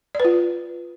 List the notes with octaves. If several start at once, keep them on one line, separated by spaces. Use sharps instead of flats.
F4 B4 D5